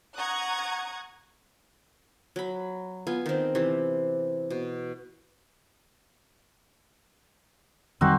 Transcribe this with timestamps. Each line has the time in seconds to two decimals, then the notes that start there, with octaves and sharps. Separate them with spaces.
0.18 F#5 A#5 C#6 D#6 F#6 G#6
2.36 F#3 B5
3.07 B3 F4 G#5
3.26 D#3 C4
3.55 C3 E3
4.50 B2
8.01 F2 D#3 G3 C4 D#4 F#4